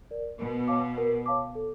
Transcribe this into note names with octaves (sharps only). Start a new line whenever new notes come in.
A#4 D5
B2 A#4
C#5 F5 A5 D6
A#4
C#5 F5 A5 D6
A4